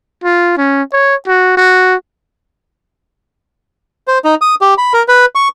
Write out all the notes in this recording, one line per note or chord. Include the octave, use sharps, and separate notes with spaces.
F4
C#4
C#5
F#4
F#4
C5
D#4
D#6
G4
B5
A#4
B4
C#6